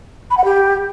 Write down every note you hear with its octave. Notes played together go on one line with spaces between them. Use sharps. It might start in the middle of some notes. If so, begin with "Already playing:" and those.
B5
F#5
G4